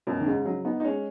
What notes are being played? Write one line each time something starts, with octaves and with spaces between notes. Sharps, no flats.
F#2 B2
D#3
G#2 C#3
C#3 F#3
B3 D#4
D#4
G#3 C#4